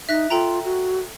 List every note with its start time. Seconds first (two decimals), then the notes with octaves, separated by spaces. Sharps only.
0.09 D#4 E5 F#6 A#6
0.30 F4 A4 G5 A#5
0.64 F#4